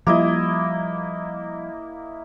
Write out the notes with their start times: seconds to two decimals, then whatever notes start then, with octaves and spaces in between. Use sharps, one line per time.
0.07 F3 G3 A#3 E4 D#5